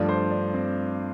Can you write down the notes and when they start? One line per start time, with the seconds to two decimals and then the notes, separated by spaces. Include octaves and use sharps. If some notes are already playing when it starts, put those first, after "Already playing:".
Already playing: G2 F3 A3 D5
0.09 C5
0.31 D4
0.54 C4